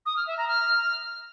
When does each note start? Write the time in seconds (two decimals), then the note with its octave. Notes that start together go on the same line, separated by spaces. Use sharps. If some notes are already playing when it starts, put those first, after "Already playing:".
0.06 D#6
0.16 F6
0.27 E5
0.38 A#5
0.48 F6